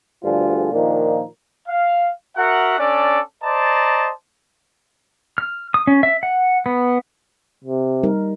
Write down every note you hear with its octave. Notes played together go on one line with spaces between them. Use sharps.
D2 G2 D3 F3 F4 G#4
A#2 D#3 F3 D4 D#4
F5
F#4 A#4 E5 F#5
C#4 D4 A4 D5
C5 D5 D#5 A5 A#5
F6
D#6
C#4
E5
F#5
B3
C3
G3 D#4 A#4